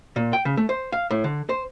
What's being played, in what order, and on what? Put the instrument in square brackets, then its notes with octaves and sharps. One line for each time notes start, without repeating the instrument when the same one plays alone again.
[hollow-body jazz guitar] A#2
G5
C#3
A3
C5
F5
A2
D3
C5